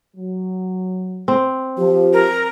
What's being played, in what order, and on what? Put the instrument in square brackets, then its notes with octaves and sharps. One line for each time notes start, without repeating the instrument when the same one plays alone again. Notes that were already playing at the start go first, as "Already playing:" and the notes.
[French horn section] F#3
[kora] C4
[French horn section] F3 [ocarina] G4
[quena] A#4